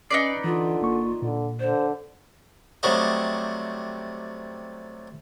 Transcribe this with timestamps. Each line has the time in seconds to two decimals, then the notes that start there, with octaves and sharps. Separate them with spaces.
0.11 C#4 D#4 B4 D5 C7 C#7
0.44 D3 E3 F4
0.81 G#1 A#3 C#6
1.22 A#2 D3
1.60 D3 C5
2.83 C3 F#3 G3 A3 C5 D#5